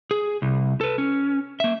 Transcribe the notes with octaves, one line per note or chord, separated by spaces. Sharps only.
G#4
C2
A4 B4
C#4
A#3 E5